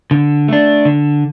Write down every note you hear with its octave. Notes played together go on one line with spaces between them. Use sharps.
D3
A3 D4
D3